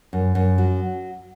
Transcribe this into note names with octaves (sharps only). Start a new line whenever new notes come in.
F#2
F#2
F#3